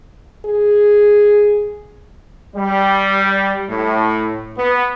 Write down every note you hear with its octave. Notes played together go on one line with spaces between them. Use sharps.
G#4
G3
A2
B3